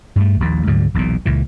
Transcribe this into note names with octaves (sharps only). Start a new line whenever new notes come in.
G2 A3
A#1 D#2 A#2
D2 G#2 D3 F#3
E1 B1 E2 A#2
C#2 A#2 E3